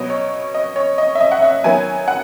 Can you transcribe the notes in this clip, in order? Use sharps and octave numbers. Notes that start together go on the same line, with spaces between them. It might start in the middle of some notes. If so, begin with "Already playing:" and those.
Already playing: B2 F#3 B3 D#5
C#5
D#5
C#5
D#5
E5
D#5
F#5
E5
D#3 F#3 B3 G#5
F#5